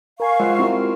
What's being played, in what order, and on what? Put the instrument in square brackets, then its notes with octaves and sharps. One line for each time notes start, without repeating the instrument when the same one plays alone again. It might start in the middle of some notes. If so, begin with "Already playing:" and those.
[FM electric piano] A#4 G#5 [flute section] F5 C#6
[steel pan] G#3 F#5 [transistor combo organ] F4 C5
[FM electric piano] C4 F#4 G4 [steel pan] E4 A#4